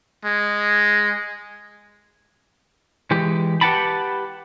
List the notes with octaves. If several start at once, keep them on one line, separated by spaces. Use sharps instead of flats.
G#3
E3 G#3 G4
G4 B4 F#5 G5 A5 B5